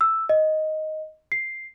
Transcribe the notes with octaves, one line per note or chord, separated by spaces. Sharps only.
E6
D#5
C7